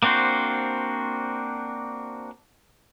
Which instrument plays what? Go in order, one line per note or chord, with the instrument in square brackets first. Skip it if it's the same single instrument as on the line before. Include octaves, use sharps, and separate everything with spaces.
[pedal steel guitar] A#3 C4 D4 F#4 C5